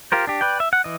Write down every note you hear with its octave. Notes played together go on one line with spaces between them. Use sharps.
F4 G4 A#4 C5
D4 G4
B4 D5 G5
E5
F#5
E3 D#5